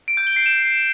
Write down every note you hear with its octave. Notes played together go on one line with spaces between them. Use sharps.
D7
G6
G7
C7
E7